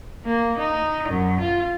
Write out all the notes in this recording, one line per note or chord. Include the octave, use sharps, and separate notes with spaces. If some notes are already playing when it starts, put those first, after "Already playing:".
A#3
D#4
F#2
F4